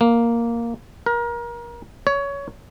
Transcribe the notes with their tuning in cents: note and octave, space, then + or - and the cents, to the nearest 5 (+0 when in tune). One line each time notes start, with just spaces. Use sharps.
A#3 +0
A#4 +30
C#5 +20